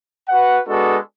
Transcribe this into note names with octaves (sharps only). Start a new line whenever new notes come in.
F#4 B4 F#5
G#3 B3 D4 F#4 A4